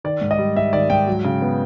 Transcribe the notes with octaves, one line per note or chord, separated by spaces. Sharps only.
D#3 D5
G#2
D#5
G3
G#2 E5
D#3 D5
G#2 G5
F#3
C#3
B3